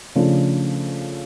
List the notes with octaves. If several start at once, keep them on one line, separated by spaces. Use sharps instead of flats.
C#3 F3 A3 D4